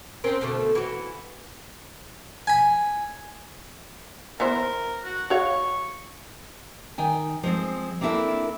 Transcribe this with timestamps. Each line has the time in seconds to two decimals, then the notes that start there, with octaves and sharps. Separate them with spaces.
0.24 C4 C#4 A#4
0.41 B2 D3 A3
0.75 E3 F#4
2.47 G#5 B5
4.40 E3 B3 A#4 C5
5.04 F#4
5.30 F#4 C#5 F5 C#6
6.98 D#3 G5 G#5
7.43 F3 G#3 C4
8.01 A#3 C4 D4 E4 A4 A#4